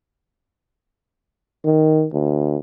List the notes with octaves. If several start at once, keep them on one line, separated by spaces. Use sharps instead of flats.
D#3
D2